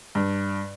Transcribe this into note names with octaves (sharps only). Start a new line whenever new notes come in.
G2